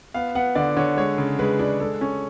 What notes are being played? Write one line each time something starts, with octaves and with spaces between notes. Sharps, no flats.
B3 F5
B3 F#5
D3 D5
D3 C#5
G#3 C#5
C#3
G#3 B4
D4
G#3 A4
C#4